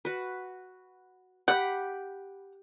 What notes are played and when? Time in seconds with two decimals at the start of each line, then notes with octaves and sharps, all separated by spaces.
0.05 F#4 B4
1.48 G4 F#5 B5